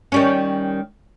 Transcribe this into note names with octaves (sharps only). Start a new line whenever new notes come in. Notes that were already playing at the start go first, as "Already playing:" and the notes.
D#3 G3 C#4